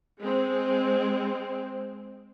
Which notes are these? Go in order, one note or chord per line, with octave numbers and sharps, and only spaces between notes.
G#3 C4